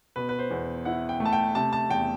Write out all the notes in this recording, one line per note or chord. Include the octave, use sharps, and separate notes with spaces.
B2 B4
B4
C5
E2
E4 F#5
G5
A3
A5
G5
C3 A5
A5
E2 G5